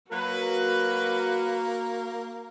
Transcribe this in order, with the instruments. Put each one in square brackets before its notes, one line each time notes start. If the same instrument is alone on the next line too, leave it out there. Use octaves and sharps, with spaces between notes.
[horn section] F#3 A#4 B4 [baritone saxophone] A#3 [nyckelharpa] F#4